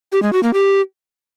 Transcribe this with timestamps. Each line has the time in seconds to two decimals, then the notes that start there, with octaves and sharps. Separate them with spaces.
0.12 G4
0.23 G#3
0.33 F#4
0.43 A#3
0.53 G4